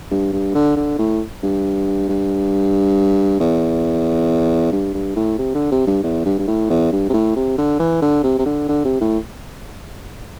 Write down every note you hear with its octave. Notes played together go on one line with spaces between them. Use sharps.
G2
G2
D3
D3
A2
G2
G2
E2
G2
G2
A2
C3
D3
C3
G2
E2
G2
G2
A2
E2
G2
C3
A2
C3
D3
E3
D3
C3
C3
D3
D3
C3
A2